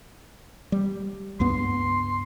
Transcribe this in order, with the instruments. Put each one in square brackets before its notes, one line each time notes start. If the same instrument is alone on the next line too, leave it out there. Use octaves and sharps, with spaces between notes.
[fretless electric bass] G3
[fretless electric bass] C#2 G2 B3 [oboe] C6